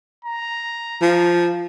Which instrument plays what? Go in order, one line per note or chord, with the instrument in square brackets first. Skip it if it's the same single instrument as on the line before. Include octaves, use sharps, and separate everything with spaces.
[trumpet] A#5
[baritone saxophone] F3